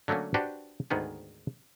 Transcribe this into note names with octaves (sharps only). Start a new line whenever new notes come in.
D3 F#3 A3 A#3 C#4
D4 F#4 G4 B4 C5
D2 G#2 D#3 B3 G#4